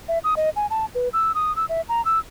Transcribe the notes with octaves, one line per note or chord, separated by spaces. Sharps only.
E5
D#6
D#5
G#5
A5
B4
E6
D#6
E6
E5
A#5
E6